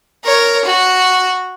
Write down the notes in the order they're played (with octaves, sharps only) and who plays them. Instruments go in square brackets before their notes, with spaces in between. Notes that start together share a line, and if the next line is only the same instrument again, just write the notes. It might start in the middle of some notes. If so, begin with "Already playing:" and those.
[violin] A#4 C#5
F#4